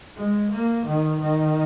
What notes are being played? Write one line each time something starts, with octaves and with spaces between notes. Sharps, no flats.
G#3
A#3
D#3
D#3